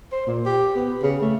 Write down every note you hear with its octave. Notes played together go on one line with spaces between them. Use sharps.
C5
A#2
G4
B3
C#3
A3